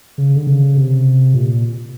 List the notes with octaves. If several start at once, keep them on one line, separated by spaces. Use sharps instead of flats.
C#3
D3
C#3
C3
A#2